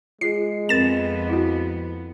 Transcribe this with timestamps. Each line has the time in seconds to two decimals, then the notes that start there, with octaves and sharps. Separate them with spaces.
0.21 G#3 F4 G#4 C7
0.69 F2 B3 C4 A#4 A6 E7
1.30 E4 F#4